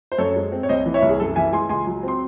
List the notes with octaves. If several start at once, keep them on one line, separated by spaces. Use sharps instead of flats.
C5
F#2 A4 C#5
G#3
C4
C#5
C2 C5 D#5
E3
C#5 E5
C2
G#4
F#2 A4
E3 E5 G#5
G#3 G#5 C6
C#2 G#5 C6
F#3
C4 C6